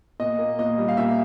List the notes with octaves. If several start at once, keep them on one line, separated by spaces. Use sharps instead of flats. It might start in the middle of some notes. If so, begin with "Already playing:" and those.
A#2 D#5
A#3
A#2 D#5
G3
F5
A#2 E5